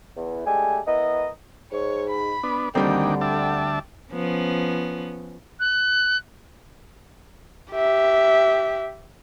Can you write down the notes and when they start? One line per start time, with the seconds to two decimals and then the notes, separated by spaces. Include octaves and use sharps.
0.16 E2
0.46 G#3 A3 D4 G4 G#5
0.86 B3 E4 A#4 D#5
1.72 G#2 C#5
2.09 B5
2.43 B3 D4
2.75 D2 D3 D#3 G3 A#3 C4 D4 G5
3.21 D4 E5 G5 A5
4.12 F3 B3 C#4
5.60 F#6
7.73 G4 E5